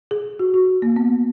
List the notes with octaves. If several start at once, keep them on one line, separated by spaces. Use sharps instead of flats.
G#4
F#4
F#4
A#3
B3